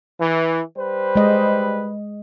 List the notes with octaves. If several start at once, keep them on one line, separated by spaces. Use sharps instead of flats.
E3
G3 B4 C5
G#3 D#5